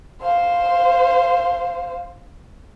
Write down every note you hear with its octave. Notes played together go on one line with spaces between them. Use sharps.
C5 F5